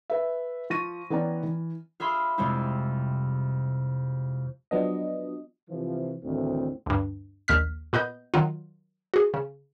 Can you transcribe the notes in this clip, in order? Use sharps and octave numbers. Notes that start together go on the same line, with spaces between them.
B4 E5
F3 C#6 A#6 D#7
E3 B3 C#4 D5 G5 A#5
E3
F4 G#4 E5 B5 C6
F2 C3 G3 G#3 C4 E4
F3 F#3 B3 D4 D#5
C3 E3 F3
A1 D2 A2 D#3 C4
D2 G2
A#1 D#2 F6 B6
A#2 B3 B4 D#5 G6
D#3 F#3 F4
F#4 G#4
C#3